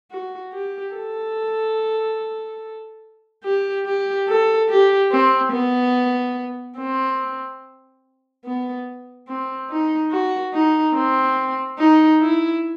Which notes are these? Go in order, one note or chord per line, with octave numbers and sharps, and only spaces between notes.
F#4
G4
A4
G4
G4
A4
G4
C4
B3
C4
B3
C4
D#4
F#4
D#4
C4
D#4
E4